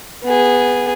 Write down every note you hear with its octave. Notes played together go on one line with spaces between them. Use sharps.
B3 G#4